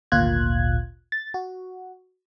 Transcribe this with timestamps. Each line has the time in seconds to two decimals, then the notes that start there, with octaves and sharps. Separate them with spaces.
0.12 G#1 D2 A#2 F4 F#6 G#6
1.12 A6
1.34 F#4